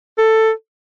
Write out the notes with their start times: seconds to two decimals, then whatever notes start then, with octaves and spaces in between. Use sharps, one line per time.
0.18 A4